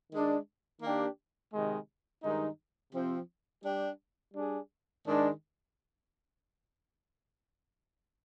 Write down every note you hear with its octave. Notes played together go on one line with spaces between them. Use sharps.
D#3 G#3 D4
D#3 A#3 D4 G4
C3 D#3 G#3
G2 D#3 G#3 D#4
C3 F3 C4
G3 D4 G4
G3 D4 G#4
G#2 D#3 G#3 D4